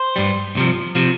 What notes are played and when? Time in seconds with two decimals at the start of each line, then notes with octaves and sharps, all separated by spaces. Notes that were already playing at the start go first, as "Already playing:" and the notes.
Already playing: C5
0.16 G2 G3
0.55 C2 C3 F3
0.95 C3 F3